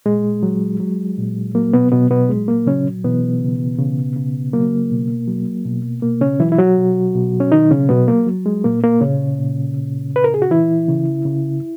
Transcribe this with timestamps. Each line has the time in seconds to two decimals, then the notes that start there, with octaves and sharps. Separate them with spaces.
0.06 A#2 G#3
0.43 F#3
0.80 F#3
1.18 A#2
1.54 F#3 A#3
1.73 B2 B3
1.92 B2 F#3 B3
2.10 B2 B3
2.29 A#2 G#3
2.48 A#3
2.66 C#3 F#3 C#4
3.04 B2 E3 B3
3.41 C#3
3.78 C#3
4.16 C#3
4.53 F#3 A#3
4.91 B2
5.28 F#3
5.65 B2
6.03 B2 A#3
6.21 C#3 C#4
6.40 E3 F#3 E4
6.52 E4
6.58 F#3 F#4
6.78 B2
7.15 B2
7.40 C#4
7.52 D#3 F#3 D#4
7.71 C#3 C#4
7.89 B2 F#3 B3
8.08 A#3
8.27 F#3
8.46 G#3
8.64 A#2 A#3
8.83 A#3
9.01 A#2 C#3 C#4
9.38 A#2
9.77 A#2
10.13 A#2 B4
10.24 A#4
10.34 G#4
10.42 F#4
10.51 E3 E4
10.88 C#3
11.25 C#3